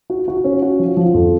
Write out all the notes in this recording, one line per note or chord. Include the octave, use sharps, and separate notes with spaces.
F#4
F#4
C#4
F#4
F3
F3
F2